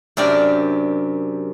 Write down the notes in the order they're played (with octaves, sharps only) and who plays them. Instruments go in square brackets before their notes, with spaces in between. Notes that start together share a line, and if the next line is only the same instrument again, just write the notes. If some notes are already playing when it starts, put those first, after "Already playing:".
[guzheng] F#2 C3 D4 G4 A#4 D5